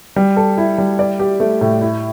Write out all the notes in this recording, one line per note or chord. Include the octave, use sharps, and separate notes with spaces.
G3
A4
E4
G3
D5
G4
A3
A2
E4